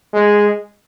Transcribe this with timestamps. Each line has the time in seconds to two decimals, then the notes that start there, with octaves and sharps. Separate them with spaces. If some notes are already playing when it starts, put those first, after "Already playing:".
0.14 G#3